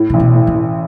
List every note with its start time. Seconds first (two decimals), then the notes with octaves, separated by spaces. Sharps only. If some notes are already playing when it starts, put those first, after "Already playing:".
Already playing: A2
0.10 A1 C3
0.19 B2
0.34 A2
0.47 E3
0.54 A2